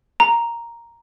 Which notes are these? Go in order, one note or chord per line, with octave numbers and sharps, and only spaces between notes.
A#5